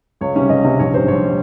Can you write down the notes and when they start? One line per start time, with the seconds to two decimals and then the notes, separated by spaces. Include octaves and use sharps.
0.21 C#2 C#5
0.35 C3 G3 C#4
0.49 C#2 D#5
0.64 C3 G3 C#4
0.79 A#1 C#5
0.93 G#2 G3 C5
1.08 A#1 C#5
1.25 G3